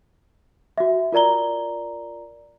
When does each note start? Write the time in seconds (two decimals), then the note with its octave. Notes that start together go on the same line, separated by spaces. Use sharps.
0.78 F#4 E5
1.12 F4 A#4 D5 A#5 G7